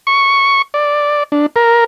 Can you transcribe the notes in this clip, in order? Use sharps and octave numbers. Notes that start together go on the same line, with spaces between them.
C#6
D5
D4
A#4